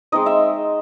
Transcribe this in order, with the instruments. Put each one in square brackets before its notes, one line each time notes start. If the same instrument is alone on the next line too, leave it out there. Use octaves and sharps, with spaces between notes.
[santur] G#3 C4 D#4 D#5
E5